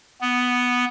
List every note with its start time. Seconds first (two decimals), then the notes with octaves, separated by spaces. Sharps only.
0.21 B3